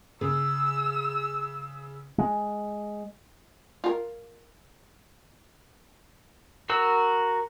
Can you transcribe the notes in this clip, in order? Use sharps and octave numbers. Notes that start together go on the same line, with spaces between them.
C#3 E6
G#3
F4 A#4
F#4 A#4 E6